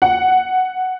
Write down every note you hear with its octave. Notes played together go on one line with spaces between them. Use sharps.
F#5